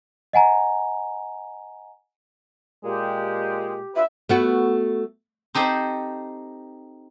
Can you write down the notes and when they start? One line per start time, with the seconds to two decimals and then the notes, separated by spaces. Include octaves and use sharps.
0.33 D#5 F#5 G#5 A#5
2.84 A#2 G#3 G4
3.95 D4 F4 B4 E5
4.29 A3 B3 F#4
5.55 C4 D#4 G4 A4 C5